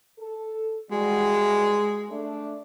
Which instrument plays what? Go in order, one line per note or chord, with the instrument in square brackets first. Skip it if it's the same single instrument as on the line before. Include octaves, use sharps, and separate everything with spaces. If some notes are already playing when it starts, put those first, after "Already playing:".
[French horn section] A4
[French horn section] E3 G3 F#4 [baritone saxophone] G#3
[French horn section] A3 D4